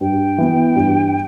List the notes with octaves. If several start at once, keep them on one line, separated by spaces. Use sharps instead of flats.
G2 G5
E3 B3
G2